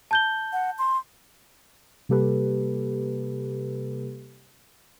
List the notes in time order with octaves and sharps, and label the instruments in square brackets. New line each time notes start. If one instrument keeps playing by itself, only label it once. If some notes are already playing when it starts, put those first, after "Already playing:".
[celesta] A5 G6 G7
[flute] F#5
C6
[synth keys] C3 G3 A#3 G4 A4 B4